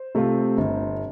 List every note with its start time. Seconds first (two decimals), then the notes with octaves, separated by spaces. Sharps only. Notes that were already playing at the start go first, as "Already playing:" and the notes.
Already playing: C5
0.15 C3 A3 F4
0.57 G1